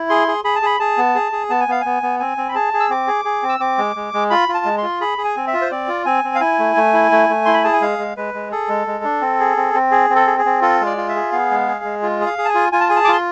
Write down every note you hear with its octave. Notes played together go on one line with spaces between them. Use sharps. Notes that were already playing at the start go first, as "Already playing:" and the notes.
Already playing: E4
G#4 C6
G#4
G#4 B5
A5
G#4 B5
G#4 A5
B3
G#4
G#4
B3 A5
G#5
B3 F5
B3 G#5
B3
C4 G#5
C4
B5
G#4 A5
G#4
E6
C4 D6
G#4
G#4
C4
E6
C4 D6
G#3
G#3
G#3
F4 B5
F4
A5
G#3
F4 C6
G#4 B5
G#4
G#5
C4
E5
F4
C5
C4 D5
F4
C4 G#5
C4
F5
E4 G#5
A3
A3
E4
A3
A3
E4 C6
B5
G#4 A5
G#5
G#3 F5
G#3
G#3 B4
G#3
G#4 A4
G#3
G#3
D4
C4
G#4
C4
C4
G#4
C4
A4
G#4
G#4
C4
F4 A4
G#3
D5
F4
E5
G#4
B3 F5
G#3
G#4
G#3
F4
G#4
F5
G#4
A5
G#5
F4
F4 G#5
A5
G#4 G#5
A5
D6
F4 C6